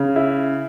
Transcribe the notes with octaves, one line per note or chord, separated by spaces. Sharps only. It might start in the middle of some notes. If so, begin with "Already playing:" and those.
Already playing: C#3
E4